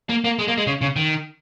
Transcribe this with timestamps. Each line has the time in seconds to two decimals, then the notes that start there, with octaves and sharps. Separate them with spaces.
0.09 A#3
0.25 A#3
0.39 G#3
0.48 A#3
0.58 G#3
0.67 C#3
0.81 C#3
0.96 D#3